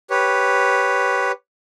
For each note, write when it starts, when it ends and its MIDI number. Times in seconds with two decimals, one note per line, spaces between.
0.10 1.32 67
0.10 1.32 71
0.10 1.32 73